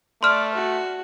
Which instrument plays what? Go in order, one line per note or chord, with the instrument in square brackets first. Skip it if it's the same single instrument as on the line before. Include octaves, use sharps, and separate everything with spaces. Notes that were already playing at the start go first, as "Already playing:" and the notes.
[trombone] A3 [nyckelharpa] D5 [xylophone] C6 F6
[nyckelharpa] F#4